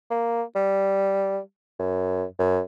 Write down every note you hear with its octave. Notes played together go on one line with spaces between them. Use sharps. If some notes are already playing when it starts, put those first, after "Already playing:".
A#3
G3
F#2
F#2